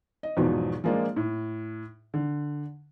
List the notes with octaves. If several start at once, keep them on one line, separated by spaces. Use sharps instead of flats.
D#5
E2 G#2 B2 F3 F#3
F3 G#3 A#3 D4 F4
A2
D3